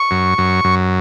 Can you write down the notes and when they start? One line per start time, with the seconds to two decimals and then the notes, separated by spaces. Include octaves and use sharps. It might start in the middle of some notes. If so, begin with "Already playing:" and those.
Already playing: C#6
0.11 F#2
0.38 F#2
0.64 F#2